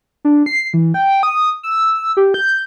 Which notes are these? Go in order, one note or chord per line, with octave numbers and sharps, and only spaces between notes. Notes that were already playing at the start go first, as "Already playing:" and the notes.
D4
C7
E3
G5
D#6
E6
G4
G6